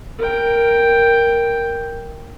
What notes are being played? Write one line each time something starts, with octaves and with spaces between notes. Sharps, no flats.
A#4 G5